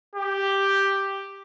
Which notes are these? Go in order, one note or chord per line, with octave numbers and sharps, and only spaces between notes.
G4